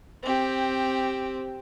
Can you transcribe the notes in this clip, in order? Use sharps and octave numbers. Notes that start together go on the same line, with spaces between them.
C4 G4